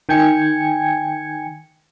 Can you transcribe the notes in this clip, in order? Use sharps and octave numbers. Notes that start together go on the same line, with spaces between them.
D#3 G5 G#5 G#6 C#7